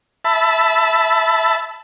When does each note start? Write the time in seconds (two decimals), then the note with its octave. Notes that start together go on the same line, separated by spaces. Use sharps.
0.25 E5 A5 B5